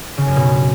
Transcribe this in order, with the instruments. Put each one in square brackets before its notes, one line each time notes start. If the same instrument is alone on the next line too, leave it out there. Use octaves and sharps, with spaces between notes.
[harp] C#3
F#2
B2